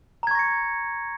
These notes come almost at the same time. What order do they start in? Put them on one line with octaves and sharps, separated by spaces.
A#5 G#6 C#6 A#6 C#7